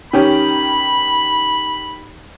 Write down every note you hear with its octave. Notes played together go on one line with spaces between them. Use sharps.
D#3 C#4 G4 B5